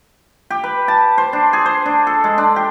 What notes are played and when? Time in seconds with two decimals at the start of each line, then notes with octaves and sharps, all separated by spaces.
0.50 G4
0.64 B4
0.88 A5
1.18 C5
1.33 D4
1.53 G#4
1.66 C5
1.86 D4
2.07 A4
2.24 G#3
2.38 D4
2.56 G4